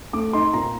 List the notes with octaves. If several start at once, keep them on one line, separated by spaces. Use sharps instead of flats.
A3 D6
D#4 C6
A#2 A#5